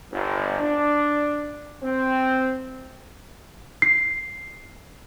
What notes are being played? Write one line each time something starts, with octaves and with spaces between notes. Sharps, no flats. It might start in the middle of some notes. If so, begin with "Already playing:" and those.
G1
D4
C4
C7